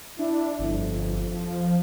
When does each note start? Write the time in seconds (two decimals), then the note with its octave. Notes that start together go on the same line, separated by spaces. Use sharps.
0.19 D4 E4
0.59 G1 F2
1.34 F3